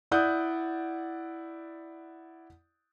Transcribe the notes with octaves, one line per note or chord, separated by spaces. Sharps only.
E4 D5 F#5 D#6 F#6 G6